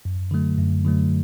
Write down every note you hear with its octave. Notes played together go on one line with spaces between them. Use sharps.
F#2
D3 F#3 A3
F#2
D3 F#3 A3